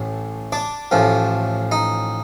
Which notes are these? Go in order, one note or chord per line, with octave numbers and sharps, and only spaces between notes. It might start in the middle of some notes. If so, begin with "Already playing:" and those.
Already playing: A1 A2
D4 D5
A1 A2 F3
D#4